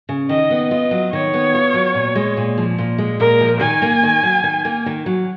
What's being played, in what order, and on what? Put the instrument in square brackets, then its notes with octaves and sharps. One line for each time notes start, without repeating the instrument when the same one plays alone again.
[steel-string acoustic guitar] C#3
[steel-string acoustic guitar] D#3 [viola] D#5
[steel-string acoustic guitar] B3
[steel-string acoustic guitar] F4 [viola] D#5
[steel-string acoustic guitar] F#3
[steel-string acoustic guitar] D#3 [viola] C#5
[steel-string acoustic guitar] B3
F4
F#3
A#2
G#3
A#2
F3
A#2
G#3
[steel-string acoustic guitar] A#2 [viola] A#4
[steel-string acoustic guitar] F3
[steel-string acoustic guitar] D#3 [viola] G#5
[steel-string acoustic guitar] A#3
D#3
F#3
D#3
A#3
D#3
F#3